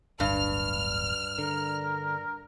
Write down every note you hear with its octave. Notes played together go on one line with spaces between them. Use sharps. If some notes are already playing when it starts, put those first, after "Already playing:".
D1 G1 G2 F6
D3 A#4